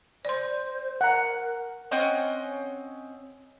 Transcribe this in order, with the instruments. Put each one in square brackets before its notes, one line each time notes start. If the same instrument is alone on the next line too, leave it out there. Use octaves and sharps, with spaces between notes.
[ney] C5 [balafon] D5 C6
[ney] A#4 [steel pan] F#5 A#5
[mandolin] C4 C#4 D#5 F#5